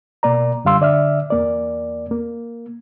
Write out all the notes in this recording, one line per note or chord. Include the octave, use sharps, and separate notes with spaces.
B2 A#3 D5 A#5
F#2 D3 G3 F5 C6 E6
D3 D5 E5 F6
E2 A#3 D5
A#3